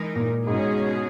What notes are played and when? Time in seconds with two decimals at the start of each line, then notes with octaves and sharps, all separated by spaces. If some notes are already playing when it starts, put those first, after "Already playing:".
Already playing: E3 G#3 D#4 A#4
0.15 A#2
0.47 G#2 B2 G#3 C#4 G#4